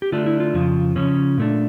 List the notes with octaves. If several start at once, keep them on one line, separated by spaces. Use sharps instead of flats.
G4
D3 A3 D4 F4
E4
F4
F2 C#3 F3
C#3 F3 C#4
A#2 A3 D4